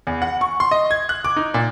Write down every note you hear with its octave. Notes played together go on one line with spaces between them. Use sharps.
E2
F#5
C#6
C6
D#5
G#6
F#6
D6
D#4
A#2